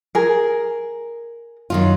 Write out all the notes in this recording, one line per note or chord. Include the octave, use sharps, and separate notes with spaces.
G#4 A#4
F#2 D#3 F4